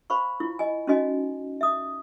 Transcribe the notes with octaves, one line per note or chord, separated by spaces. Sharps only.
C5 F5 B5 C#6
E4 F4
D#5 G#5
C#4 D#4 F#4 D#5 G#5
E5 D#6